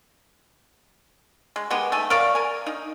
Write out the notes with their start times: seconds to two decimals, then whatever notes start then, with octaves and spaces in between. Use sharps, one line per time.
1.56 G#3
1.70 D#3 G#3 B3 G4
1.92 A3 G#5
2.10 A#4 C#5 D5 F5
2.35 A#4 G#5
2.66 D#4